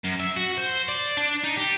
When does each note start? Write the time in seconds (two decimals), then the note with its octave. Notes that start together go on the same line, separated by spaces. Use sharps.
0.04 F#2
0.20 E5
0.36 F#4
0.57 C5
0.88 D5
1.17 D4
1.44 D#4
1.57 G4